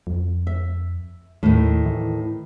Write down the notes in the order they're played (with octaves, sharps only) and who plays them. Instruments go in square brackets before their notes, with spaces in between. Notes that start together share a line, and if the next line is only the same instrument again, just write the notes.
[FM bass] F2
[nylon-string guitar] E5
[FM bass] D#2 [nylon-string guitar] A2 D#3
[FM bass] E3